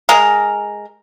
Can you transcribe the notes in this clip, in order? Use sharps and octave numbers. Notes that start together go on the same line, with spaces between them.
G#3 G#4 A#4